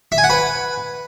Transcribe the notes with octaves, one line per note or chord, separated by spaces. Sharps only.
E5
G#5
F#5
B4